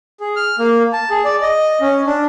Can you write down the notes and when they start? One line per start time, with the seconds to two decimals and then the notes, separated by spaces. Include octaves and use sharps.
0.20 G#4
0.36 F6
0.59 A#3
0.93 A5
1.10 G#4
1.25 D5
1.42 D#5
1.81 C#4
2.07 D4